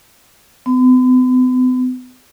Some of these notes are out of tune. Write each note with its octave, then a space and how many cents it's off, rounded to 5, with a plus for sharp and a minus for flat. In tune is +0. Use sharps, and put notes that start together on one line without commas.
B3 +45